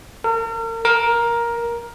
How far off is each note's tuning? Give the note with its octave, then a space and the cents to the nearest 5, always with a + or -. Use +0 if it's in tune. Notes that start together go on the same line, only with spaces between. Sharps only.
A#4 -40
A#4 +10